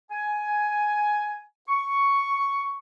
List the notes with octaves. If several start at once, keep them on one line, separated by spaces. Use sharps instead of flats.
G#5
C#6